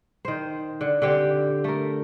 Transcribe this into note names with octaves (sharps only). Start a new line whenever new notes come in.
D#3 C5
D3
D3 C4 G4
A3 A#4